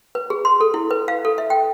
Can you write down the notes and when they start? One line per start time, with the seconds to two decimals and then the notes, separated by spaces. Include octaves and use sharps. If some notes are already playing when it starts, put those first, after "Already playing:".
0.15 B4
0.30 G#4
0.45 C6
0.61 A4
0.74 E4
0.91 B4
1.08 F5
1.25 A4
1.38 E5
1.50 G5